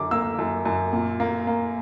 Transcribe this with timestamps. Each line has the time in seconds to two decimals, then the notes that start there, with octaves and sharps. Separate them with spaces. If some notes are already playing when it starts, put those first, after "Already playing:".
Already playing: F#2 D3 D6
0.11 A#3 E6
0.39 F#2
0.65 F#2
0.92 A#2
1.20 A#3
1.47 A#3